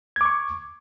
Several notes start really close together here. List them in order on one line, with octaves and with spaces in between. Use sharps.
G#6 D6 C#6